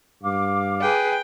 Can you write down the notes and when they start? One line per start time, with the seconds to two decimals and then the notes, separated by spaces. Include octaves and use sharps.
0.23 G2 F5 D6
0.82 G#4 B4 G5